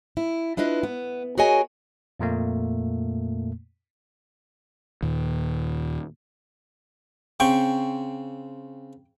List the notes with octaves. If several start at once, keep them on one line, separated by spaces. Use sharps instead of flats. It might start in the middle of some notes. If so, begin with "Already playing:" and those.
E4
D4 E4 F4 B4 D#5
B3
F#4 G#4 A#4 C#5 D#5 G#5
F2 A#2 A3 A#3
D#2 A#2
C#3 C4 G5 C#6